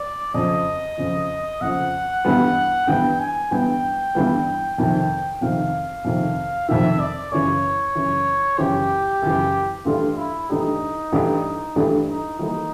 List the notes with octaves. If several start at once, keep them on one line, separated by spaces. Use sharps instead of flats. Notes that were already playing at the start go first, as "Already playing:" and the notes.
Already playing: D5
F2 C#3 F3 D#5
F2 C#3 F3
F2 C#3 F3 F#5
G2 E3 G3 B3
G2 E3 G3 B3 G5
G#5
G2 E3 G3 B3 G5
G2 E3 G3 B3
F2 C3 D#3
F2 C3 D#3 F5
F2 C3 D#3
F2 C3 D#3 E5
D5
F#2 C#3 E3 C#5
F#2 C#3 E3
F#2 C#3 E3 G4
F#2 C#3 E3
G2 E3 A3 D4 F4 G4
E4
G2 E3 A3 D4 D#4 G4
G2 E3 A3 D4 G4
G2 E3 A3 D4 G4
D#4
E3 G3 A#3 D#4